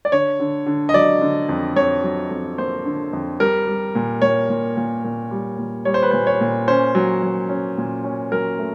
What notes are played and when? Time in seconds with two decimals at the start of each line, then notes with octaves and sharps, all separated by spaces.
0.05 D5
0.12 D3 C#5
0.40 D3
0.66 D3
0.89 D#5
0.94 F#3 D5
1.21 D3
1.49 F2
1.76 F2 C#5
2.04 F#3
2.31 F2
2.58 A#3 C5
2.85 D3
3.13 F2
3.40 G3 A#4
3.67 G3
3.95 A#2
4.22 A#2 C#5
4.50 A#2
4.77 A#2
5.04 A#2
5.31 G3
5.58 A#2
5.85 G3 C#5
5.94 C5
6.03 B4
6.11 A#2 C5
6.27 C#5
6.41 A#2
6.68 C#4 C5
6.95 F#3
7.22 F#3
7.49 C#4
7.78 A#2
8.04 C#4
8.32 F#3 A#4
8.59 A3